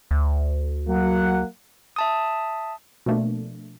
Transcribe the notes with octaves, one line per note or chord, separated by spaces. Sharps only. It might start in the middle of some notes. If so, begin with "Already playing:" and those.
D2
F#3 A#3 F#5
E5 A5 D#6
B2 F3 A3 A#3 D4